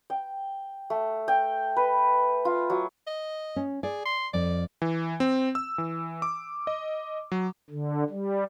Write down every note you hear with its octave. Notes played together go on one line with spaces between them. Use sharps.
G5
A3
G5
B4
F4
F#3
D#5
C#4
G#4 D5
C6
F2 D5
E3
C4
E6
E3
D6
D#5
F#3
D3
G3